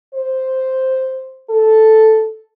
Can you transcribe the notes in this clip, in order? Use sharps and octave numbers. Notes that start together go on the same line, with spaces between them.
C5
A4